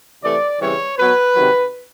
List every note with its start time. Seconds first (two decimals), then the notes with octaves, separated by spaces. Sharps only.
0.23 C3 E3 A3 D5
0.61 C#3 E3 G3 C4 C#5
0.98 B2 F#3 B3 B4
1.36 C3 D#3 F#3